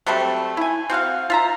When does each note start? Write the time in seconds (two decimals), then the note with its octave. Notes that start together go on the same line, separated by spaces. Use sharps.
0.06 F#3 G3 A3 C4
0.57 E4 G#5
0.90 C4 F#4 F5 F#5
1.30 F4 E5 A#5